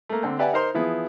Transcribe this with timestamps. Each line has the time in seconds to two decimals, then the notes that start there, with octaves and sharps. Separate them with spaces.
0.09 A3 A#3
0.23 D3 C4
0.39 G4 B4 D5 E5 F#5 G#5
0.53 D#4 A#4 C5 C6
0.74 E3 F3 B3 E4 G#4